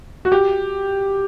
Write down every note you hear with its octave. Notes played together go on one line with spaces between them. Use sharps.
F#4
G4